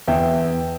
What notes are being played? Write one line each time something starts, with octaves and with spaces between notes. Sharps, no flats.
E2 E5 G5